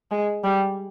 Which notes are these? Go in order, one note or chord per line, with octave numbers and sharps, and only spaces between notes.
G#3
G3